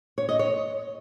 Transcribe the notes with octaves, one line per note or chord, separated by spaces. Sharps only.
C#5
D#5
C#5